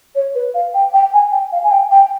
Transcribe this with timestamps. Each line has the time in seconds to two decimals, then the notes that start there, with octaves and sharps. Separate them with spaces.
0.15 C#5
0.35 B4
0.54 F5
0.74 G5
0.94 G5
1.14 G#5
1.32 G5
1.52 F5
1.64 G#5
1.71 G5
1.91 G5